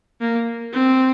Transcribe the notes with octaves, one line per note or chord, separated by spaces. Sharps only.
A#3
C4